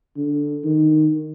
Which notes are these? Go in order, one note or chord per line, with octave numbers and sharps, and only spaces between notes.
D3
D#3